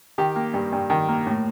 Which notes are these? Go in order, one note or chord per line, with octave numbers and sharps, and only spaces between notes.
D#3 G4
A#3
G2
G2
D#3
A#3
A2